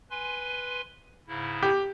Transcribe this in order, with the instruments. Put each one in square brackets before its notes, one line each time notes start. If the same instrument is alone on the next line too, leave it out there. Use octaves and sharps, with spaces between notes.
[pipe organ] B4 G#5 C6
G#2 C#3 E4
[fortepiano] G4